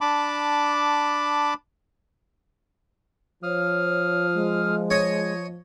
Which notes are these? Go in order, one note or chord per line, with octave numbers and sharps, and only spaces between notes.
D4 A5 B5 D6
F3 C#5 F5 D#6 F6
G#3
C#5 D#5